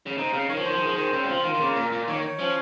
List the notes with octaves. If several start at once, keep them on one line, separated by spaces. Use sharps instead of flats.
C#3
C3 D#4
C#3 F5
D#3 C#5
F3
D#3 C5
F3
D#3
F3 G#4
D#3 C5
C#3 C4
G3
F3 F4
D#3 F4
D#3
C#3 A#3
A#2 A#4
A#2 A#3
D#3 C#5
C#5
F3 C#4